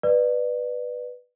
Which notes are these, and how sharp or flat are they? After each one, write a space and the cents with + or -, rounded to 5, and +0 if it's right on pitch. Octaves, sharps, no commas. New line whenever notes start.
B4 +0 D5 +25